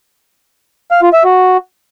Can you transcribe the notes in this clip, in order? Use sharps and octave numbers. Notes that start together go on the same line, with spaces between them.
F5
F4
E5
F#4